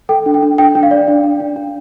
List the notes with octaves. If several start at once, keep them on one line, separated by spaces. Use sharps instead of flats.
A4 G5
D4
G5
D4
D4 G5
D4
F5
D5
D4
D4
D4
D4